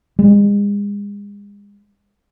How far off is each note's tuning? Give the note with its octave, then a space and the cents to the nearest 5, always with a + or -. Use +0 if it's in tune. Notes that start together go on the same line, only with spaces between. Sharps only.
G#3 -40